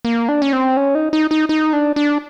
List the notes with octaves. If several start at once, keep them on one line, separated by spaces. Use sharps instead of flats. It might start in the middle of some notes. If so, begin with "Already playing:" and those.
A#3
D4
C#4
C4
C#4
D#4
D#4
D#4
D#4
D4
D4